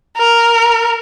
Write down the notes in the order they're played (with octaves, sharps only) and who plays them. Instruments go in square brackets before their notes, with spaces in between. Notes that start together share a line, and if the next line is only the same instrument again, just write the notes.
[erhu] A#4